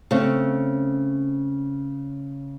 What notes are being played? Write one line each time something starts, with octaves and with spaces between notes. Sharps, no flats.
C#3 A3 C4 C#4